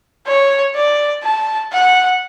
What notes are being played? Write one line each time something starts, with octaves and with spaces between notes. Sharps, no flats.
C#5
D5
A5
F#5